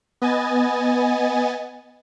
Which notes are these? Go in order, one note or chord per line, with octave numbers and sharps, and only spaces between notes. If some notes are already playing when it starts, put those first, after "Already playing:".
B3 D#5 G#5 A6